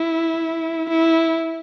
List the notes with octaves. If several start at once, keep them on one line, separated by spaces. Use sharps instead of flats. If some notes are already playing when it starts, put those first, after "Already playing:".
Already playing: E4
E4